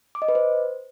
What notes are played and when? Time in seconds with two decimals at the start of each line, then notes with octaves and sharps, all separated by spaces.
0.15 D6
0.22 D#5
0.29 B4
0.35 C5